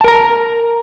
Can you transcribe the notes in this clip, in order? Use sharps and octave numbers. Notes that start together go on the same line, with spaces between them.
A#4 A5 A#5